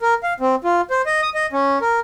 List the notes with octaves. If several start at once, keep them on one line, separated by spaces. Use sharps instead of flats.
A#4
F5
C4
F4
C5
D#5
D#6
D#5
C#4
A#4